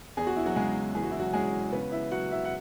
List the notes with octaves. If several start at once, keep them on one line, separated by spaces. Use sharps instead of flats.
E2 G#4
F#4
E4
F#3 F#4
C#3 G#3 G#4
E3 G#4
F#4
E4
F#3 F#4
G#3 C#4 G#4
C#3 B3 B4
E4 E5
F#3 F#4 F#5
E4 E5
F#5